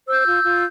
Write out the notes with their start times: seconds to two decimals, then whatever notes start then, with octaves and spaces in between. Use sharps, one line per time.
0.08 C5 E6 G6
0.26 F4
0.44 F4